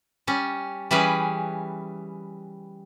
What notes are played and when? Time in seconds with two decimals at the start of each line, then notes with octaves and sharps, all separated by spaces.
0.27 G3 C#4
0.91 E3 G3 C#4 G#4 B4